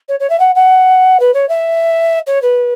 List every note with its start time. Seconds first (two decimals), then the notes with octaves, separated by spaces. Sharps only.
0.08 C#5
0.20 C#5
0.29 E5
0.40 F#5
0.55 F#5
1.20 B4
1.34 C#5
1.49 E5
2.27 C#5
2.42 B4